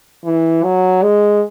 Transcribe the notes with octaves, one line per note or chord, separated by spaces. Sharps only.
E3
F#3
G#3